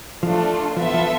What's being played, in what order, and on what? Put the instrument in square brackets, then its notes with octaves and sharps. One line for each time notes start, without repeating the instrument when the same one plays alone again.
[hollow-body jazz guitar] F3 [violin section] A3 D4 F4
[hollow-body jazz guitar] F3 [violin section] B3 F4 A4 E5 A5
[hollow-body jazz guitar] F3